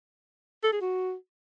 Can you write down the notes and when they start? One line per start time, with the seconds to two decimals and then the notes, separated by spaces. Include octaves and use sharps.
0.64 A4
0.72 G#4
0.81 F#4